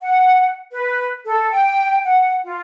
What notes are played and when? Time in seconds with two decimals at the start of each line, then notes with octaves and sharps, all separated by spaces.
0.02 F#5
0.72 B4
1.26 A4
1.51 G5
2.04 F#5
2.44 F4